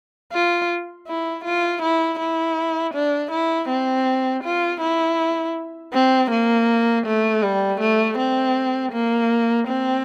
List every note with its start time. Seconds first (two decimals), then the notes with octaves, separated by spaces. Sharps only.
0.33 F4
1.07 E4
1.44 F4
1.82 E4
2.19 E4
2.94 D4
3.31 E4
3.69 C4
4.44 F4
4.81 E4
5.93 C4
6.31 A#3
7.06 A3
7.43 G3
7.80 A3
8.18 C4
8.92 A#3
9.68 C4